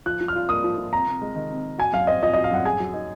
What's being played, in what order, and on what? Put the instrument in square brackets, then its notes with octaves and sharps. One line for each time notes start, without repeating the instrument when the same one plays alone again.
[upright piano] F3 [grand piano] F#6
[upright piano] F3
[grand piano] F6
[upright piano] F4
[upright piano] A#3 [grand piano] D#6
[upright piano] F3
F3
[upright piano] C3 [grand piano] A#5
[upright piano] C3
G#3
D#3
C3
C3
[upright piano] F#4 [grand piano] G#5
[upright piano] F#2 [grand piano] F5
[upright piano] C4 [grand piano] D#5
[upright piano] F3 [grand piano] D#5
[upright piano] F#4 [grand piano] D#5
[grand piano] F5
[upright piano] F#2 [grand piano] F#5
[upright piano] G#4 [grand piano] G#5
[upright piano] F#3
D#4